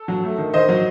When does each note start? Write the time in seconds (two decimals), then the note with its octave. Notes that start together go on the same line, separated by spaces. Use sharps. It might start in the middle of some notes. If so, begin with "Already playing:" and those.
Already playing: A4
0.08 F#3
0.24 A3
0.38 D#3
0.53 D#3 C5 D#5
0.69 F#3